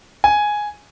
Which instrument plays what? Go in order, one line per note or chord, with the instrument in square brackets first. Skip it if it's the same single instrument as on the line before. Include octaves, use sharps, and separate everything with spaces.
[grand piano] G#5